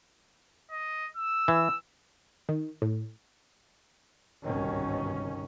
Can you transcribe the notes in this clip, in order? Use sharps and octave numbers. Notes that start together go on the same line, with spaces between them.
D#5
E6
E3
D#3
A2
G1 C2 G#2 B2 D#3 C#4